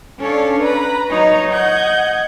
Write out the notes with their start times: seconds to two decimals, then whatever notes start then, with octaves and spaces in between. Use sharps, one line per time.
0.19 C#4 D4 A4 C#5 F5
0.59 B4 A#5 B5
1.08 F#3 D#4 C#5 D#5
1.52 D#5 F#5 G6 G#6